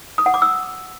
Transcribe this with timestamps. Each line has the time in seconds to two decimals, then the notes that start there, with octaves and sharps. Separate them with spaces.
0.18 D#6
0.26 F#5
0.34 D6
0.42 E6